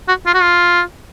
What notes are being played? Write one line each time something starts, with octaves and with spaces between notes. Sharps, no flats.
F#4
F4
F#4
F4